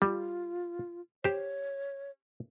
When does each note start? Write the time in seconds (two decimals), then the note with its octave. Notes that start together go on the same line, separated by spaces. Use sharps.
0.02 G3 F4
1.24 G4 C5 C#5